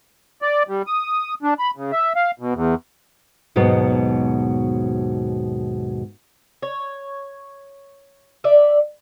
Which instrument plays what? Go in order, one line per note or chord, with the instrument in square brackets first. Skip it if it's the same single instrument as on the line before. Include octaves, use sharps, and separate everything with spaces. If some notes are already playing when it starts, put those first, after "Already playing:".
[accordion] D5
G3
D#6
D4
B5
C#3
E5
F5
B2
E2
[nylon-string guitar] D#2 G#2 B2 F#3 B3
[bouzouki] C#5
D5 E5